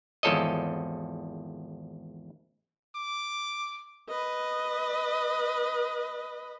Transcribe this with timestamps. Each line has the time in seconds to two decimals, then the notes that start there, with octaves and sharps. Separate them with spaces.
0.23 G#1 E2 F3 A4 C#5 D#5
2.95 D6
4.08 B4 D#5